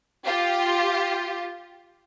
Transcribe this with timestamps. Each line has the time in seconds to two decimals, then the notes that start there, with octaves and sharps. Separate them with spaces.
0.25 F4 G4